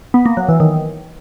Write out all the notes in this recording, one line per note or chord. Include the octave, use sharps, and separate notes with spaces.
B3
A#3
F#3
E3
D#3